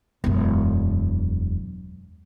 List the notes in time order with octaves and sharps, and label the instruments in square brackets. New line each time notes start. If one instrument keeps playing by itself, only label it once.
[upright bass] E1 F#2